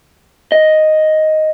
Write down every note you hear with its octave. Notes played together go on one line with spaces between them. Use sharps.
D#5